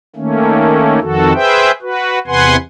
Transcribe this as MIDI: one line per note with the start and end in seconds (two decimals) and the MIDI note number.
0.16 0.99 51
0.16 0.99 57
0.16 0.99 58
0.16 0.99 61
1.01 1.33 41
1.01 1.33 51
1.01 1.33 66
1.01 1.33 69
1.34 1.71 68
1.34 1.71 71
1.34 1.71 72
1.34 1.71 76
1.34 1.71 79
1.82 2.19 66
1.82 2.19 71
2.27 2.56 40
2.27 2.56 48
2.27 2.56 71
2.27 2.56 78
2.27 2.56 80
2.27 2.56 84